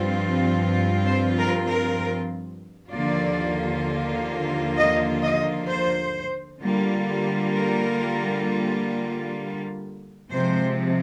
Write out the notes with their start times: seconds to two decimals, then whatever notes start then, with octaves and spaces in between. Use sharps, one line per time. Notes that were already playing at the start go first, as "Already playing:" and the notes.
Already playing: G2 F3 C4 F4
1.06 C5
1.37 A#4
1.67 A#4
2.91 D#2 D3 F3 A#3 F4 D5
4.76 D#5
5.22 D#5
5.69 C5
6.61 D3 G3 A#3 F4
7.54 A#4
10.31 C3 F3 G#3 C4 C5